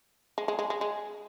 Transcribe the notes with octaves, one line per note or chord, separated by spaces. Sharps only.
G#3
G#3
G#3
G#3
G#3